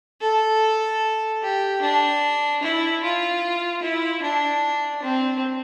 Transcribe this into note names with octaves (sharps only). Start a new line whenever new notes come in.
A4
G4
D4
E4
F4
E4
D4
C4